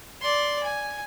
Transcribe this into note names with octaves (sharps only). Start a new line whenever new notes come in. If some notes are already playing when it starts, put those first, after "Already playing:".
D5 C6
G#5